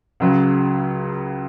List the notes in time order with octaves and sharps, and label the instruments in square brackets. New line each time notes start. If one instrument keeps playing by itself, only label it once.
[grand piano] C#2 C#3 F#3